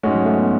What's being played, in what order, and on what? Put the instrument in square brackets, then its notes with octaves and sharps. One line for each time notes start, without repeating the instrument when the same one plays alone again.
[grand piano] G#2 G#3 C#4 F#4 [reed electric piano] A3
[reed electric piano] F#3
A3
B3